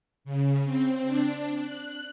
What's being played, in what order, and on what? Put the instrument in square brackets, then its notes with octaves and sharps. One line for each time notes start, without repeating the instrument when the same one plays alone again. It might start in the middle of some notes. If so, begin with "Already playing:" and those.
[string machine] C#3
C4
D4
F#6